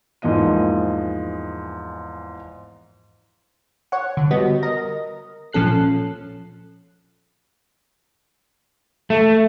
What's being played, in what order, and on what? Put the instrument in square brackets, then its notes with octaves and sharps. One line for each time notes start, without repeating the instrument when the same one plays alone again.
[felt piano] E2 G#2 F3 A#3 D#5 D#7
[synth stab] C#5 F#5
D3
G3 B3 F#4 D#5
A#4 D#5 A#6
A#2 F3 C#4 A4 F#6 C7
[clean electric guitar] A3